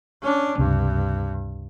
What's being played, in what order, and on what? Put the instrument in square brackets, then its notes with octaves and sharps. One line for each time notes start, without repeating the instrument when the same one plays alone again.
[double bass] C#4 D4
[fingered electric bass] C#2 C3 [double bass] G2